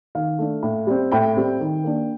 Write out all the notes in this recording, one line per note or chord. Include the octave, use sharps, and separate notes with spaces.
D#3 F5
A3 D4
A2
G3 C4
A2 G5
G3 C4
D#3
A#3 D4